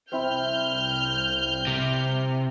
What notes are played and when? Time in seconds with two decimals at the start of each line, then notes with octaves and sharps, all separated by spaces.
0.12 C2 C4 E4 F6 G6
1.67 C3